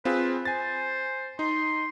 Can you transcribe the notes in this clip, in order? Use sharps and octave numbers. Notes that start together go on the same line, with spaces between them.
C4 F4 G#4 B4
C5 G#5 A6
D#4 C6